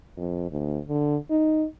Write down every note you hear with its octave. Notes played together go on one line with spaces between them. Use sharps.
F2
D2
D3
D#4